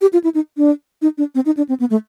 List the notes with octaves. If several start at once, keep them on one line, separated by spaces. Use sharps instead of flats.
G4
F4
E4
D#4
D4
D#4
D4
C4
D#4
D4
C4
B3
A3